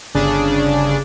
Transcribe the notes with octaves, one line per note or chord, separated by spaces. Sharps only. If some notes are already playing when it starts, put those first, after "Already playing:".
G1 C#3 D4 G#4 D5